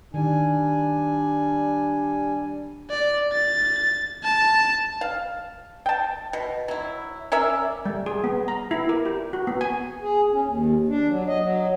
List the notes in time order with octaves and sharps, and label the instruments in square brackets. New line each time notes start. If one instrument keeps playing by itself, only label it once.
[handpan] D#3 [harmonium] G3 G#5 [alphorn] D4
[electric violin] D5
A6
A5
[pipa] F5
G5 A5
B2
F#3 E4
C#4 A#4 D5 E5
[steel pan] G3
G#4
B3
A#5
E4
A#4
G4
F#4
B3
G#5
[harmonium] G#4
C#4
D#2
D4
F#3
D#5
F#3